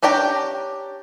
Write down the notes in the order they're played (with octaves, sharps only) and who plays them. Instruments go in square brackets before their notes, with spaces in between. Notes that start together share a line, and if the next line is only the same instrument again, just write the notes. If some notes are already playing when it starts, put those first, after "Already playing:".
[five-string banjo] C#4 D4 G4 G5 A#5